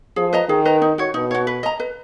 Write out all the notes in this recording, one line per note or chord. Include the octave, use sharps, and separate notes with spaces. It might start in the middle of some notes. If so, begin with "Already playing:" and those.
F3 G#4
B4 D#5 A#5
D#3 G#4
B4 D#5 A#5
D#4
F#4 C#5
B2 D#4
F#4 C#5
B4
D#5 A#5
B4